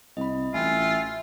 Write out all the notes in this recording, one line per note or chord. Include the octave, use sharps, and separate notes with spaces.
C2 D#5 B5
A1 F4 E5 G5 G#5